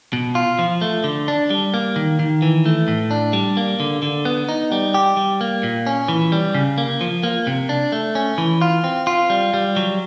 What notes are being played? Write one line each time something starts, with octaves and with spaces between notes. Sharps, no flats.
B2
F4
F3
A3
D3
D4
G3
A#3
D#3
D#3
E3
A3
A2
D4
G3
A#3
D3
D3
B3
D#4
G3
G4
G3
A#3
A#2
C#4
E3
G3
C#3
A#3
F3
A#3
C3
D4
A3
C#4
E3
F4
C4
F4
G3
G3
F#3